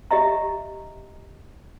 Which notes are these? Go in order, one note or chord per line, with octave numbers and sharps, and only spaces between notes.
G4 D#5 E5 A#5